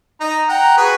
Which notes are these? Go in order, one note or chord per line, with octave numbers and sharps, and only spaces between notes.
D#4 A#5
F#5 G5 A#5
F#4 G#4 B4